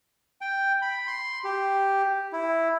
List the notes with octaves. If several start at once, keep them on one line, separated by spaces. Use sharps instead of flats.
G5
B5
C6
G4
E4